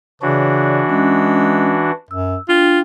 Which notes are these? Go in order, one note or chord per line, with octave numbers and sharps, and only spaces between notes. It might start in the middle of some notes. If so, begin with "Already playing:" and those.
C#3 E3 D4 F#4 C#5 D5
G#3 C#4
F#2 E6
D4 F4 G5